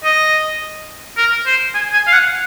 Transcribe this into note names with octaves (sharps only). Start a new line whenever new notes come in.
D#5
A#4
C5
G#5
G#5
F5
F#5